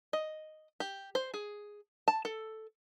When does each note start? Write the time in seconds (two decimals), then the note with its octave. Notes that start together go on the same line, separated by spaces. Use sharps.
0.13 D#5
0.80 G4
1.15 C5
1.34 G#4
2.08 A5
2.25 A4